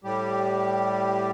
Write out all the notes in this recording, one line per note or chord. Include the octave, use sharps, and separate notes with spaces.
A2 G3 G4